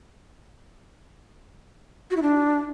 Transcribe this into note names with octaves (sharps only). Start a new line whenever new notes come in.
F#4
E4
D4